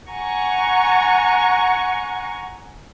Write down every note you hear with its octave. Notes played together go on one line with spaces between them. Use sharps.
F#5 G#5 A#5 C#6